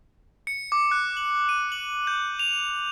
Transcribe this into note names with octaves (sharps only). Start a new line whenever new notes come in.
C#7
D6
F#6
F#7
D#7
F#7
G6
F7